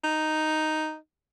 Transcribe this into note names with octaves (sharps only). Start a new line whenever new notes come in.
D#4